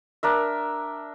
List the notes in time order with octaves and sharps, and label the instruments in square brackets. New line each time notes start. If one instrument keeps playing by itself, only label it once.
[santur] D4 A#4 E5